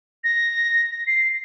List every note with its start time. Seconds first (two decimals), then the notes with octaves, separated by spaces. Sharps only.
0.24 A#6
1.07 C7